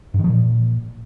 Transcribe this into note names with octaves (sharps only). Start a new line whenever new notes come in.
G2
D#3
F3
A#2